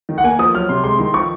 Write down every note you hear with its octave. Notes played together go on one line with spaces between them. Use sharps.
D#3
F#5
A#3 G#5
F3 D#6
F#3 F6
C3 C6
G#3 C6
D#3 C6
F3 C#6